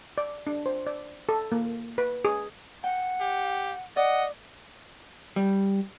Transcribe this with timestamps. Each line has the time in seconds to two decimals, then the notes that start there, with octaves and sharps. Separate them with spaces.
0.18 D5
0.47 D4
0.66 C5
0.87 D5
1.29 A4
1.52 A#3
1.98 B4
2.25 G#4
2.84 F#5 G5
3.20 G4
3.96 D5 D#5 F#5
5.36 G3